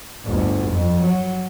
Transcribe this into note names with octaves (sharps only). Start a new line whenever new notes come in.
G1 D2
F2
F#3